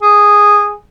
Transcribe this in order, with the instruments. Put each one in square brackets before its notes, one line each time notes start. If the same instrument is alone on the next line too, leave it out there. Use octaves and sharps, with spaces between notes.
[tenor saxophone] G#4